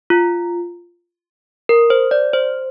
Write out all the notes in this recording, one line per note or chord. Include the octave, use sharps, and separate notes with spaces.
F4
A#4
C5
D5
C5